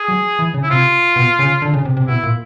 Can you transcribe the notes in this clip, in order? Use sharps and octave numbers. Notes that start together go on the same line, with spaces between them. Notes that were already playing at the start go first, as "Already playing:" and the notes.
Already playing: G#4
F#3
E3
C#3
E4
C3 F4
B2
C#3
D3
C#3
C3
C3
B2 E4
A#2